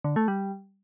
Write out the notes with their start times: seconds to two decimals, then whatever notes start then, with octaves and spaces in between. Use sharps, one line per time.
0.04 D3
0.16 A3
0.28 G3